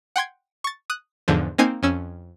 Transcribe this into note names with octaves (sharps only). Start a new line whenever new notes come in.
F#5 G5 C6 G#6
C#6 A6
D#6 F#6
E2 G#2 D3 F3
A#3 C4 D#4 G#5 C7 D#7
F2 C#4 E6